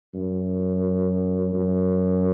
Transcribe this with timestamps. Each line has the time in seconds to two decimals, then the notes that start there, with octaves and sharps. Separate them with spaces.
0.14 F#2
1.54 F#2